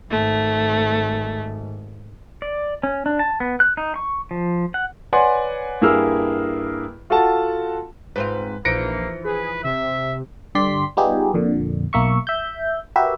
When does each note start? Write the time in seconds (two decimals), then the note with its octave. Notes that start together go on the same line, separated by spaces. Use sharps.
0.10 G#1 G#2 A3
2.42 D5
2.83 C#4
3.06 D4
3.19 A5
3.40 B3
3.60 F#6
3.77 D#4
3.96 C#6
4.31 F3
4.74 F#5
5.13 B4 C#5 D5 F#5 G#5 C6
5.81 G2 A#3 E4 G#4 E6 F6
7.10 F4 F#4 A4 F#5 A5
8.16 G#2 C4 F4 B4
8.65 A#1 E3 F3 A#3 D#4 A#6 C#7 D7
9.24 G#4 B4
9.64 C3 E5
10.55 G2 D3 G4 D5 C6 B6
10.97 G3 B3 D#4 F4 G4 G#4
11.34 F2 A#2 D3
11.93 B1 A#3 E5 C#6
12.27 E5 G6
12.96 F#4 G4 A#4 B4 E5